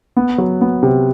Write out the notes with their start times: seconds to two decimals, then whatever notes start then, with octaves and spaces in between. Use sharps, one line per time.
0.17 B3
0.38 F#3
0.61 B3
0.83 C3